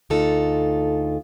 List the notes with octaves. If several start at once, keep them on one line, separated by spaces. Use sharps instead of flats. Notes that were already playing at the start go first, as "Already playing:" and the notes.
D2 D#4 F4 A4